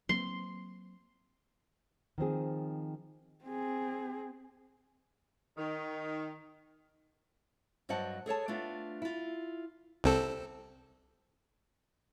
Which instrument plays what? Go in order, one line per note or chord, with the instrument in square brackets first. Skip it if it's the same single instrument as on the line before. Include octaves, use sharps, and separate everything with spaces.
[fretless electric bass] F#3 A#3 C4 [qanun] C6
[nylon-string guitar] D#3 F3 C4 G#4
[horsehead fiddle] C4 G#4
[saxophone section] D#3
[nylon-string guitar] G2 F#3 C5 D#5 F#5 A5
G#4 A4 C#5 A5
A3 B3 D4 F4
E4 F4
[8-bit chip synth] C2 C4 A4